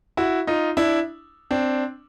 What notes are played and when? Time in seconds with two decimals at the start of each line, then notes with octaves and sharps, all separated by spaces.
0.17 E4 F#4
0.47 D#4 F4
0.77 D4 E4
1.51 C4 D4